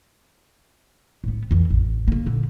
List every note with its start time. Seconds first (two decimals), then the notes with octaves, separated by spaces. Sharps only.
1.24 A2 B3
1.51 F2 E3
1.70 A1
2.08 C#3 A#3
2.26 A#2 D3